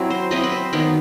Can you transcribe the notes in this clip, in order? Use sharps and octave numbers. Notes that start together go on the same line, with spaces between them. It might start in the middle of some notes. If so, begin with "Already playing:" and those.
Already playing: F#3 C4 E4
C5
F#3 C4 E4 D#5
B4
C5
D#3 F#3 B3 D#4